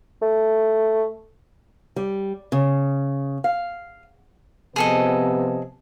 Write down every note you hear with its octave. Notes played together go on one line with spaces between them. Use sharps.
A3
G3
C#3
F5
C3 F3 B3 G#4 A4 D#5